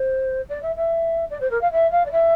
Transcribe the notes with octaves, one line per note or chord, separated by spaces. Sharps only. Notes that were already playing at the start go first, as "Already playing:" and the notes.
Already playing: C5
D5
E5
E5
D5
C5
A#4
F5
E5
F5
D5
E5